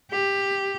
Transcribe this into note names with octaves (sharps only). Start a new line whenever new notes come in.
G4